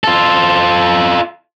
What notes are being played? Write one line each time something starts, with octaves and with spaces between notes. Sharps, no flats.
F4 A4